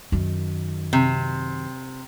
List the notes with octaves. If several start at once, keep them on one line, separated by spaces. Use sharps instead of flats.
F#2 D#3
C3